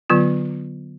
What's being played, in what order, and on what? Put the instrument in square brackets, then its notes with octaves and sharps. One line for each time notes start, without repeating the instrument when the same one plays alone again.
[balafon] D3 F#3 B3 F4